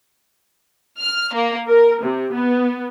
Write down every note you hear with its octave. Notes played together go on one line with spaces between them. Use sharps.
F6
A#3
A#4
C3
B3